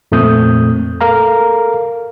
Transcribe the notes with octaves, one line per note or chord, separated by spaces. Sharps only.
F2 A#2 A3 C4 D#6 G6
A4 A#4 F5 A#5